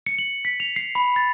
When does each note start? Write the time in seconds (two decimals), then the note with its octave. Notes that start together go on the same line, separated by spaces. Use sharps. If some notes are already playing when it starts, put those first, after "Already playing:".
0.06 C#7
0.19 F#7
0.45 B6
0.60 F7
0.76 C7
0.95 B5
1.16 A6